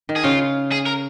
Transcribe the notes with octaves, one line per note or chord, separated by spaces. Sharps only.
D#3
G#4
C#3 F4
G#4
A#4